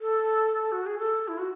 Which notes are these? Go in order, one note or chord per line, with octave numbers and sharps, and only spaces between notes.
A4
F#4
G#4
A4
E4
F#4